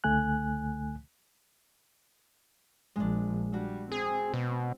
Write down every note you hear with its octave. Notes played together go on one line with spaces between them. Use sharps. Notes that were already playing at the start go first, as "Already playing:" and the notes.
C#2 D3 A3 G#5 F#6
A#1 F3 G#3 D4
G3 D4 F#4
C4 G#4
B2